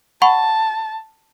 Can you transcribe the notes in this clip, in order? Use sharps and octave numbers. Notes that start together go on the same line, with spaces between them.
F#5 A5 B5 C#6